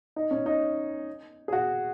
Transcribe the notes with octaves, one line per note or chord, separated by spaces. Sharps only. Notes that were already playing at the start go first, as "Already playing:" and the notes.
D#4
C#4
D#4
G#4
F#4